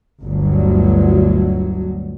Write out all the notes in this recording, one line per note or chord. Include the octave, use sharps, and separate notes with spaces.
G1 D2 F#3